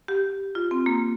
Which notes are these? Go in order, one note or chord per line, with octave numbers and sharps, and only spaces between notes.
G4
F4
C4
A#3